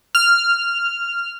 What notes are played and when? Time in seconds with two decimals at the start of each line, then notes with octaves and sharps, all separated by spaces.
0.15 F6